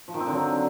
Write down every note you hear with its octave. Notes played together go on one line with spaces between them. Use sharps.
F3
D#3
C4
D3
F#3